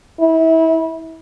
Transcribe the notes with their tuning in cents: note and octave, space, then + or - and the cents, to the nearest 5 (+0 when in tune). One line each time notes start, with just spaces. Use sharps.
E4 -30